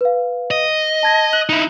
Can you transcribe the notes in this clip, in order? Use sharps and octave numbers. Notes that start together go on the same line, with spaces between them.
B4 F5
D#5
A5 G#6 A#6
F#6 F#7
D#4 E4